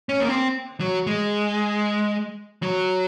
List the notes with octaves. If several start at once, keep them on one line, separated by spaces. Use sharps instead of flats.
C#4
A#3
C4
F#3
G#3
F#3